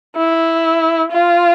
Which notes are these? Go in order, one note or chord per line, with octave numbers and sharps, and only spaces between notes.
E4
F4